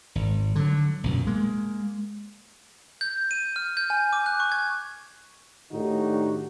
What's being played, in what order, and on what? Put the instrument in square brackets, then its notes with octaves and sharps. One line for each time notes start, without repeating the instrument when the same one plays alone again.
[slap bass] G#1
D3 F#3
B1 F#2 A#2
G#3 A#3
[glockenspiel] G6
D#7
F6
G6
G#5
D6
F#6
C#6
G#6
[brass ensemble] A2 D#3 D4 D#4 F#4 G4